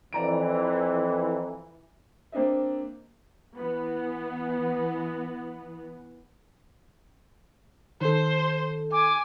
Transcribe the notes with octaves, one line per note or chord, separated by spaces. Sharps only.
F2 E3 D5 A#5 D7
A#3 C4 D4 D#5 E5
E3 B3
D#3 A4 C5
G#5 D6